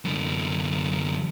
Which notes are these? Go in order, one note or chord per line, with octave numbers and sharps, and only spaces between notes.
F#2 D3